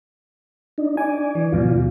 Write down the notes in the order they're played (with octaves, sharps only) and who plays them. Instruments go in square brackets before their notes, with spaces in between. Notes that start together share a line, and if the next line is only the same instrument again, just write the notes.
[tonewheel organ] D4 D#4
[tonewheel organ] D5 [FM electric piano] G#5
[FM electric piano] E3
[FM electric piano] D#2 G#2 B2 [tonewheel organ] F3 F4